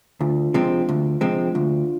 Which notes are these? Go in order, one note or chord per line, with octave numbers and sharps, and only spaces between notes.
D2 D4 F4
C3 F3 G#3 C4
D2
C3 F3 G#3 C4
D2 D4 F4